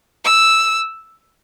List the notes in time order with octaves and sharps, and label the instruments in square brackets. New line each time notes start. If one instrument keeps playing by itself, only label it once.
[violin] E6